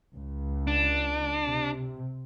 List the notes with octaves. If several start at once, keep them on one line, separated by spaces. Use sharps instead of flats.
C#2
D4
C3